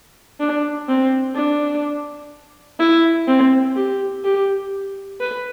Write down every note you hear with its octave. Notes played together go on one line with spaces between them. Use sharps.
D4
C4
D4
E4
C4
G4
G4
B4